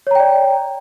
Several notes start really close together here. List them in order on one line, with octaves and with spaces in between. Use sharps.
C#5 A#5 G5 D5